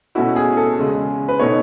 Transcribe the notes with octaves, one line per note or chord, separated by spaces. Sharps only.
B2 A3 C#4 E4 F#4
G#4
A4
E2 C#3 G#3
B4
B2 A3 D#4 C#5